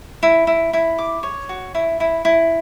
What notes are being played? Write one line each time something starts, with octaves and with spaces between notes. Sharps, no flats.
E4
E4
E4
D6
C#5
F#4
E4
E4
E4